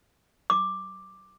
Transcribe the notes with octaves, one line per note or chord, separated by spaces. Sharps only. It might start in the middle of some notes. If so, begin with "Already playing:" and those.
D6